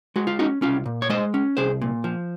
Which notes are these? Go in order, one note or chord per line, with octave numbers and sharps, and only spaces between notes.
G#3 F#4
F4
C#4 D#4 F#4
C2 C#4 F4
A#2
C#5
G#3 C5 D#5
C#4
C2 G#4 C5
A#2
F3